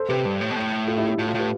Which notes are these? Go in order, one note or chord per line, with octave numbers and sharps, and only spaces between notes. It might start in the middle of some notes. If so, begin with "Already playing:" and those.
Already playing: A4 C5
C3 G4 B4
G2
A2
B2
A2
F4 A4
E4 G4
E4 G4
A2 F4
F4
A2
G4 B4